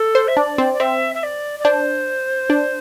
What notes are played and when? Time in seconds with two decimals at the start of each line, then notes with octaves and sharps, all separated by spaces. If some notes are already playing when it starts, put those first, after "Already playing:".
Already playing: A4
0.15 C5
0.27 E5
0.37 D4 D5
0.58 C4
0.73 D5
0.80 C4 E5
1.14 E5
1.22 D5
1.59 D5
1.64 D4 C5
2.50 D4